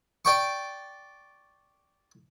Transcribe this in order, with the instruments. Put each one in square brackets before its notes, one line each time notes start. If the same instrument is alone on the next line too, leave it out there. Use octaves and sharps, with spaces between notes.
[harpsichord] D5 G5 C#6